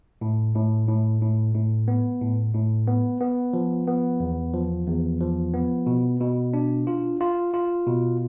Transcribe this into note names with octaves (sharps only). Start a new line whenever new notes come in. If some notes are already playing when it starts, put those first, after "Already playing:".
A2
A2
A2
A2
A2
B3
A2
A2
B3
B3
F3
B3
E2
F3
E2
F3
B3
B2
B2
D4
F4
F4
F4
B2